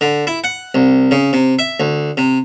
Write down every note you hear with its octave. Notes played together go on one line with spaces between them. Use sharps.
D3
E4
F#5
C2
C#3
C3
E5
D2
C3